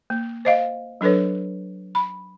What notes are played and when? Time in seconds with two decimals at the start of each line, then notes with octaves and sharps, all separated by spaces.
0.10 A#3
0.45 C5 D#5 F5
1.01 F#3 D4 A4 B4 C#5
1.95 B5